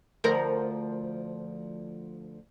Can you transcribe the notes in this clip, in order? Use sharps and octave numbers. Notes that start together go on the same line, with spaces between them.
D2 F3 A#4